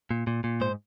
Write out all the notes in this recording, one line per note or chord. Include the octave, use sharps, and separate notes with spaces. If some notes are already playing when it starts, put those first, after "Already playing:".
A#2
A#2
A#2
G#2 C5